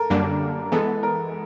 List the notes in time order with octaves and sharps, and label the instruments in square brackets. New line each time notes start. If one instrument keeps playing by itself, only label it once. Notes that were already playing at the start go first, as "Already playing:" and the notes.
Already playing: [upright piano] A4 A#4
[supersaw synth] F#2 D3 G3 A#3 D4
[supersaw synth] E3 G#3 B3 [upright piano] A4
[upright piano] A#4